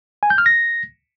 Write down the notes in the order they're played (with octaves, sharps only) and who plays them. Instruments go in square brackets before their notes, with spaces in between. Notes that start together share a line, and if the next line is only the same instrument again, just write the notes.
[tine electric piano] G#5
G6
F6
A#6